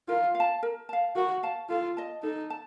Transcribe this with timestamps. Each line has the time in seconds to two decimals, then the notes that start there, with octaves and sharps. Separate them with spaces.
0.08 F4 A#4
0.35 F5
0.40 A5
0.63 A#4
0.89 F5 A5
1.16 F#4 A#4
1.43 F5 A5
1.70 F4 A4
1.97 D#5 A5
2.23 D#4 A4
2.50 A5